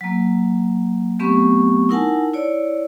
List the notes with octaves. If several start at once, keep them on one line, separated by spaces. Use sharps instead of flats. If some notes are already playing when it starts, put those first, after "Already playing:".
F#3 A#3
F#3 A3 B3 C4 G4 C#6
D#4 E4 A#4 F#5 G#5 A5
E4 C#5 D5